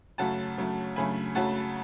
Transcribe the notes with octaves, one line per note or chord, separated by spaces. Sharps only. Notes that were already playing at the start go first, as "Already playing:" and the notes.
F#2 C#3 F#3 A3 F#5 A5
F#2 C#3 F#3 A3
F#2 C#3 F#3 A3 G#5 B5
F#2 C#3 F#3 A3 F#5 A5